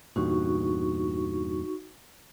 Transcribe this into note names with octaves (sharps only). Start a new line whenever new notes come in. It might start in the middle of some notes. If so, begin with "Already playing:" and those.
E2 G2 A#2 D#4 F#4 C#6